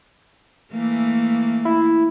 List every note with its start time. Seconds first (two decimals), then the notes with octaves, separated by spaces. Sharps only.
0.72 E3 A3 A#3
1.65 E4